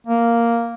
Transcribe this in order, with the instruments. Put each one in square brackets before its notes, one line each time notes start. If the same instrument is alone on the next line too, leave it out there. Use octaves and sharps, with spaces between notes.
[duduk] A#3